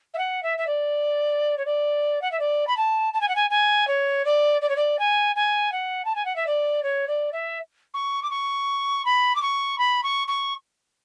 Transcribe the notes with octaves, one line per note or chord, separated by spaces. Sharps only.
E5
F#5
E5
E5
D5
C#5
D5
F#5
E5
D5
B5
A5
A5
G#5
F#5
G#5
G#5
C#5
D5
D5
C#5
D5
G#5
G#5
F#5
A5
G#5
F#5
E5
D5
C#5
D5
E5
C#6
D6
C#6
B5
D6
C#6
B5
C#6
C#6